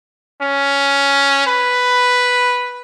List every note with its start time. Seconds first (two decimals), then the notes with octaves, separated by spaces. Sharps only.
0.41 C#4
1.47 B4